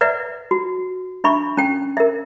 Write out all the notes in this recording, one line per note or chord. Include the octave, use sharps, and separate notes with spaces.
B4 D5 E5 F#5
F#4
D4 E5 B5 C#6
C#4 G5
A#4 E5